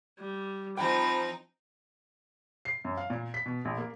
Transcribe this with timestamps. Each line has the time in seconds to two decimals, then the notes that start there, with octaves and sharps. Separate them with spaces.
0.19 G3
0.77 F3 C4 D#4 G5 B5
2.65 C7
2.85 F#2
2.97 F5
3.10 A#2
3.34 B6
3.46 B2
3.65 A#1
3.78 A#3